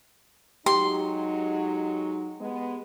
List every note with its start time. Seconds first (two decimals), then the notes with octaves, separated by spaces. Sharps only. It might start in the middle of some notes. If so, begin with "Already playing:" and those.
0.66 F#3 G#3 D#4 G4 C6
2.41 G#3 B3